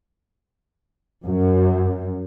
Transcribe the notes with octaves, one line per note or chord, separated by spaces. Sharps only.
F#2